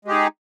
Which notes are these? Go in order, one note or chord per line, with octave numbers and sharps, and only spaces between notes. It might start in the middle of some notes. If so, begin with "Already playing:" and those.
G#3 D#4 G4 G#4